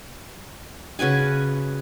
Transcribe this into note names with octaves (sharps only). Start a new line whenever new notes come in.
C#3 F#4 B4 G#5